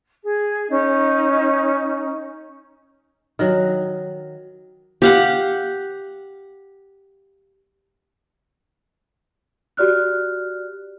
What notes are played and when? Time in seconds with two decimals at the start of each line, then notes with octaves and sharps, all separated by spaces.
0.23 G#4
0.69 C#4 D#4
3.39 D#3 F#3
5.02 G4 F5 F#5
9.77 F#4 G4 D5 F6 F#6